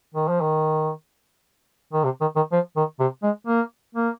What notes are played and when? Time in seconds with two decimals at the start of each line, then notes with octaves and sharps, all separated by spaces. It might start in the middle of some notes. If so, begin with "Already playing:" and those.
0.15 D#3
0.28 F3
0.41 D#3
1.93 D#3
2.04 C3
2.21 D#3
2.36 D#3
2.52 F3
2.76 D#3
3.00 C3
3.23 G#3
3.47 A#3
3.95 A#3